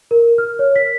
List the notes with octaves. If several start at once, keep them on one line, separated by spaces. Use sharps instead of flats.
A#4
F6
C#5
B6